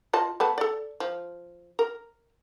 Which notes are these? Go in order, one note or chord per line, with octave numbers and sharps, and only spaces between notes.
F4 D#5 A5
A3 B3 A5
A4 D5
F3
A#4